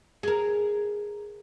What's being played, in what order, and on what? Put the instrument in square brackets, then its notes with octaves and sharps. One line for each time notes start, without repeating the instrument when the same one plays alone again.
[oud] G#4 A#4